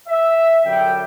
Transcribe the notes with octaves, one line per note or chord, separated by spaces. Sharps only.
E5
F#2 D3 G3 G5